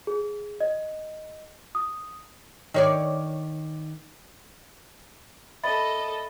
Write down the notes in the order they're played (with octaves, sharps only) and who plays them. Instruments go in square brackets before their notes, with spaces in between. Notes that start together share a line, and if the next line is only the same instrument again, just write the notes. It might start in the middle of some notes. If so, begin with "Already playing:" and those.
[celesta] G#4
D#5
D#6
[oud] D#3 C#5 D5
[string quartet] A4 D#5 [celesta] E5 B5 A6